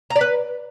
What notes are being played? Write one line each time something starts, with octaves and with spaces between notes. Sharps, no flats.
A#5
D5
B4